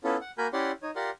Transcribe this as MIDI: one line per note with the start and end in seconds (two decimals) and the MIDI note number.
0.04 0.17 59
0.04 0.17 61
0.04 0.17 64
0.04 0.17 65
0.04 0.17 69
0.21 0.31 78
0.38 0.47 58
0.38 0.47 66
0.38 0.47 70
0.38 0.47 80
0.38 0.47 83
0.38 0.47 91
0.53 0.72 61
0.53 0.72 64
0.53 0.72 67
0.53 0.72 74
0.53 0.72 78
0.53 0.72 84
0.83 0.91 63
0.83 0.91 73
0.96 1.10 65
0.96 1.10 67
0.96 1.10 70
0.96 1.10 74
0.96 1.10 78
0.96 1.10 84